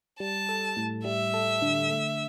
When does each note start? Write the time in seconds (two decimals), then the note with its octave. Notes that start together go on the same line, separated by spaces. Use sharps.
0.20 G3 A5
0.49 A4
0.77 A2
1.05 G3 E5
1.34 A4
1.62 D3
1.90 A3